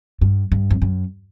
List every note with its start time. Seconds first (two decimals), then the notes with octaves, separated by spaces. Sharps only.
0.21 G2
0.52 G2
0.71 F2
0.82 F#2